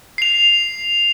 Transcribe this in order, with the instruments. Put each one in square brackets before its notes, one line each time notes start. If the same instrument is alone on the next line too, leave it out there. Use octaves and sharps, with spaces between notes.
[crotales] C7 F7